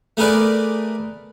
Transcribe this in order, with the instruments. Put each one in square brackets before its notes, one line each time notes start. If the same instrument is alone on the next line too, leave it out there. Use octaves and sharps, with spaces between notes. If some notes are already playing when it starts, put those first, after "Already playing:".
[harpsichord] A3 G#4 A#4 B4 D5